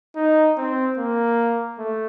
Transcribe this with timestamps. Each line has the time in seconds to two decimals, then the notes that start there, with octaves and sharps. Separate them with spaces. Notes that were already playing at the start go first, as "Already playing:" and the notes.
0.16 D#4
0.57 C4
0.98 A#3
1.79 A3